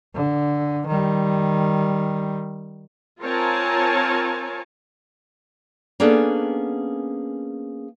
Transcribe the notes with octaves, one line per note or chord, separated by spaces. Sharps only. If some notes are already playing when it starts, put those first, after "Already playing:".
D3
D#3 G3
C4 F4 A#4 C#5 G#5 A5
A#3 B3 C#4 D4 G#4 A4